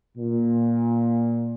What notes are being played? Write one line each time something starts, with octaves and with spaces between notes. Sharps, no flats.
A#2